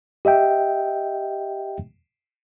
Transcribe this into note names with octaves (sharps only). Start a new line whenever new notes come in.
G4 D#5 E5 G5